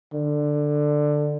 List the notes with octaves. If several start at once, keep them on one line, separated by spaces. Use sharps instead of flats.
D3